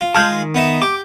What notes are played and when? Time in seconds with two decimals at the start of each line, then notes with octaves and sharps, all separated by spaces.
0.01 F4
0.15 G#3 F4 G#4 A5 F6 G6
0.30 D#3
0.55 B3 D#4 E5
0.82 G4 D6